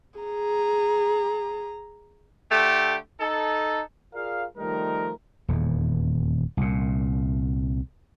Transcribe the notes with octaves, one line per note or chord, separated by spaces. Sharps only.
G#4 A#5
D3 A3 G4
D#4 A4
F4 G#4 A#4 D5 F5
D#3 F3 G3 A3 D#4 A#4
D#1 E2
C2 A#2